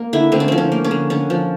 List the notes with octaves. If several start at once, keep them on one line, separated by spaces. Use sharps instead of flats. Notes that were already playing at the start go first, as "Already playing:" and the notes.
Already playing: A#3
D3 E4
D3 C4
C#4
F3 C4
C#4
A#3
C#4
D3
D3 C#4
F3